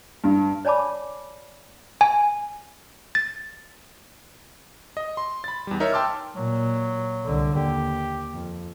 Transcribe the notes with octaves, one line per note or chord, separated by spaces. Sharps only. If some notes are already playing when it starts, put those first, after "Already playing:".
G2
C#5 D5 G#5 A5 B5 D6
G#5
A6
D#5
C6
B5 A6
E2 G3
D#4 A#4 C#5 E5
G5 A5 C6 D6 E6 F6
A#2 F#3
C2 D3
D#2 G4
F2